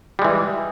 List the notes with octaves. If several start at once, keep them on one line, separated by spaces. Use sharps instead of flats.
E3 G3 G#3